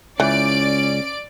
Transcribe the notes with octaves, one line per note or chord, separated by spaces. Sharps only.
C#2 E3 C#4 D5 D7